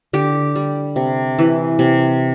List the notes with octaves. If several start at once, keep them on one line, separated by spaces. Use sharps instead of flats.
D3 G4
G3
C3
E3
C3